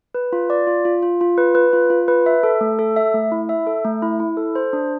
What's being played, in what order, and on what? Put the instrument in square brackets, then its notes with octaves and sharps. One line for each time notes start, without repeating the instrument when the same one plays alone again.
[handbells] B4
F4
D5
F4
F4
F4
F4
B4
B4
F4
F4
B4
E5
A4
A3
A4
E5
A3
E4
E5
A4
A3
E4
E4
A4
C5
D4